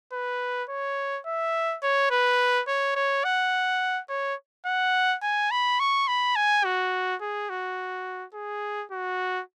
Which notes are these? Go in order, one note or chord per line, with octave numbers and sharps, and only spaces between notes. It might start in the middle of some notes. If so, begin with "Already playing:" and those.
B4
C#5
E5
C#5
B4
C#5
C#5
F#5
C#5
F#5
G#5
B5
C#6
B5
G#5
F#4
G#4
F#4
G#4
F#4